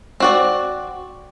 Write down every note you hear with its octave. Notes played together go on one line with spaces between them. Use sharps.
C4 F#4 D5